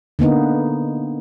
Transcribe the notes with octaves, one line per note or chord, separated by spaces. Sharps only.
D3 A#3 B3 D#4